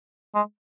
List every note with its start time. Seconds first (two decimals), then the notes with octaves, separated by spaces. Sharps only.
0.35 G#3